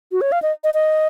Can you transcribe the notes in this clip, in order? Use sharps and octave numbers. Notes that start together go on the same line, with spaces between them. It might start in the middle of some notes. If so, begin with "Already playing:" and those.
F#4
C#5
F5
D#5
D#5
D#5